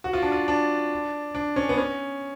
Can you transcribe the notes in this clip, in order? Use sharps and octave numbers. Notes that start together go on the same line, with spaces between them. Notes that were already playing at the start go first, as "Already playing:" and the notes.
F#4
F4
D4
F4
D4
D4
C#4
B3
C#4